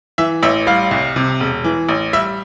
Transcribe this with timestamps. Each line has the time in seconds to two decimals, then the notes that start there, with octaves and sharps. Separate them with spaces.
0.18 E3 E5
0.43 A1 E5
0.67 G3 F5
0.91 C2
1.16 C3
1.40 E1
1.64 E3
1.89 A1
2.13 G3 E5